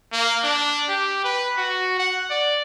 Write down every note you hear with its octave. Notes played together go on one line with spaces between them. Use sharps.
A#3
D4
G4
B4
F#4
F#5
D5